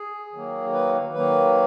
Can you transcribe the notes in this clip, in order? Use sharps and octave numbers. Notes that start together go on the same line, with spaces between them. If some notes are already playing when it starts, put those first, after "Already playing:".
Already playing: G#4
D#3 F#3 A#3
B4
D#3 F#3 A#3 B4